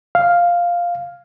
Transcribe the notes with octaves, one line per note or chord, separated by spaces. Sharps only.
F5